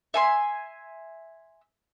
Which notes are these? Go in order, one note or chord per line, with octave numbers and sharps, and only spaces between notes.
E5 G#5 C6